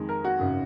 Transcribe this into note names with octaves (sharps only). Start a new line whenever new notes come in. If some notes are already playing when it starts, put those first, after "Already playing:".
Already playing: F2 D#3 G#3
A#4
F#4
G#1 F#2 C#3